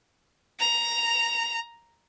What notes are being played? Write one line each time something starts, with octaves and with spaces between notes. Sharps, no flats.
A#5 F7